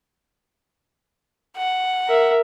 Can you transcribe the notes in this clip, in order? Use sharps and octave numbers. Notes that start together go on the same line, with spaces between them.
F#5
A#4 E5